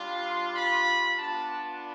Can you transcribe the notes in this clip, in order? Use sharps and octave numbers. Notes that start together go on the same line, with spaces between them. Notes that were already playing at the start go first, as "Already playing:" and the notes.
Already playing: G3 D4 F4
C6
B5
B3 D4 F4 A5